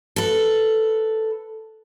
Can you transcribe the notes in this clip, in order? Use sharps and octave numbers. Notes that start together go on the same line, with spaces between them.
A4 B4